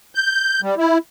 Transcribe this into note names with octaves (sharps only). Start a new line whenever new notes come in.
G6
G3
E4